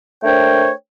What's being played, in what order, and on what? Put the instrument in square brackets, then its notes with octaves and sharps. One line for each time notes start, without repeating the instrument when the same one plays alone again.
[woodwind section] A3 D4 A#4 C5 C#5 G5